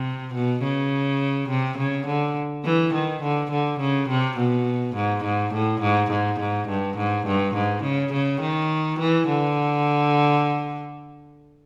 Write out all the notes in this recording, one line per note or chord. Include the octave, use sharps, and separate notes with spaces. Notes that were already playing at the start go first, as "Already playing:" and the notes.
Already playing: C3
B2
C#3
C3
C#3
D3
E3
D#3
D3
D3
C#3
C3
B2
G#2
G#2
A2
G#2
G#2
G#2
G2
G#2
G2
G#2
C#3
C#3
D#3
E3
D3